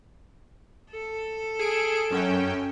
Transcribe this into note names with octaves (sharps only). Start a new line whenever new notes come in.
A4
G#4 D7
F#2 C#4 G5